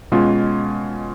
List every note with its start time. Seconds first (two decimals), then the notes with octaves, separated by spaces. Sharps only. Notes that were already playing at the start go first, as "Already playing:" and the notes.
0.12 B2 G#3 C#4 F4